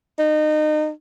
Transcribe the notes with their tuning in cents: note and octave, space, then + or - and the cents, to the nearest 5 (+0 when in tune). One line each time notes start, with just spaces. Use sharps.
D#4 -30